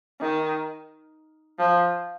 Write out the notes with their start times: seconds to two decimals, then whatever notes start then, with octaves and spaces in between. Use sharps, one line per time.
0.21 D#3
1.59 F3